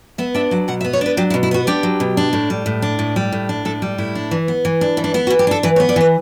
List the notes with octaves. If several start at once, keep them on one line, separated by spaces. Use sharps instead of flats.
B3 E5
D4 E5
F#3 F#5
B2 F#5
E5
B3
C#5
D4 B4
F#3 G4
E4
B2
E4
B3 F#4
D4 G4
F#3
B2
D4
A2
G3
A2
D4
A2
G3
A2
D4
A2 A4
G3
A2 E4
D4
E3
B3
E3
D4
E3
D4
B3 E4
F#4
E3
G4
D4 A4
E3 B4
C#5
B3
D5
E3 B4